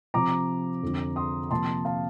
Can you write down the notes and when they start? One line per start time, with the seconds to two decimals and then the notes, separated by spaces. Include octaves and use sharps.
0.14 C3 F3 C4 A#5 D6
0.83 F2 D3 F3
1.16 C6 D#6
1.51 C3 F3 A#3 A5 C6
1.85 F5 A5